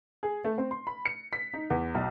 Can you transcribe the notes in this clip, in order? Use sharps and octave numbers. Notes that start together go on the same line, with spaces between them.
G#4
A3
C4
C6
B5
C#7
B6
D#4
E2
B1